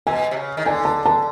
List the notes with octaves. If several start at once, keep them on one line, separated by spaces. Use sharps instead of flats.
B2 G#5
C3
C#3
D#3
D3 G#5
A5
A5